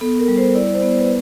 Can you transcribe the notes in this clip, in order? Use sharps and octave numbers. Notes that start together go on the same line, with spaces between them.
B3 A4
A#4
G3
C5
E4 D5
C5
B3
C5
B4